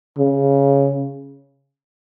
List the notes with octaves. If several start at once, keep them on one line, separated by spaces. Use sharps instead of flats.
C#3